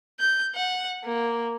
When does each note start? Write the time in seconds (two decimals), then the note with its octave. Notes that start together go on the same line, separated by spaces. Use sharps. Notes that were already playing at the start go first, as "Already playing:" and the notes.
0.20 G6
0.55 F#5
1.04 A#3